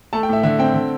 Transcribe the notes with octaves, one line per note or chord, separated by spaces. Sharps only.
A3 A5
G5
A2 E5
D3 E5
C4 G5
D3